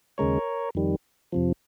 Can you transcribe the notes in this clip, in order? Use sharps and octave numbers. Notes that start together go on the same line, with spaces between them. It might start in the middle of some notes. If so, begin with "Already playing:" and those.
D#2 C#3 G#3 A#4 C#5
F2 D#3 G3
F2 C3 F3